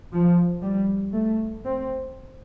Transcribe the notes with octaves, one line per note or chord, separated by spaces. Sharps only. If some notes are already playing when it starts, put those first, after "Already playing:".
F3
G3
A3
C4